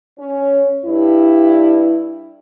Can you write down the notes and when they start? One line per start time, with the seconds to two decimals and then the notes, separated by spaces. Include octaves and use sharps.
0.18 C#4
0.85 G2 E4